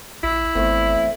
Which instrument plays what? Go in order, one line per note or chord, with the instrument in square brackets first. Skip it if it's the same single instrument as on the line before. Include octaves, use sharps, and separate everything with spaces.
[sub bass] A#1 [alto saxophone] E4
[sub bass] G#1 [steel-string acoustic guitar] E2 A3 C4